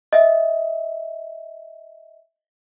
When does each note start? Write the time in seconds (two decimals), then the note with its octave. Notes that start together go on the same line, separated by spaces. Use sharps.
0.13 D#5 E5